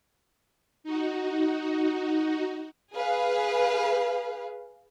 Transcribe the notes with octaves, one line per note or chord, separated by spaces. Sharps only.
D#4 F#4
G#4 B4 F5